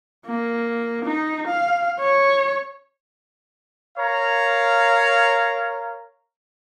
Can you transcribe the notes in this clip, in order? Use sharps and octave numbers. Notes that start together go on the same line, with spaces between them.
A#3
D#4
F5
C#5
A#4 C#5 F5 A#5